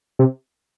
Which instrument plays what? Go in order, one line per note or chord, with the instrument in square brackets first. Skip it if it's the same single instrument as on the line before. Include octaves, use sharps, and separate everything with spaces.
[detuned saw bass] C3